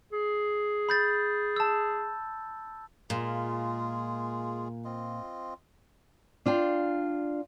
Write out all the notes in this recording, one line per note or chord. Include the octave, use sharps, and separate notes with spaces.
G#4
B5 G6 A6
A5 E6
A#2 G#3 F4 G#4
C4 F4 D#5
D4 F4 F5 G5